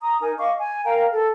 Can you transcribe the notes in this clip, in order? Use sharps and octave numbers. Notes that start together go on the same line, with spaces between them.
A#5 D#6
D#4 A#4 G#5
D#5 F5 C#6 D6
G#5
A#4 F5 G5 A#5
A4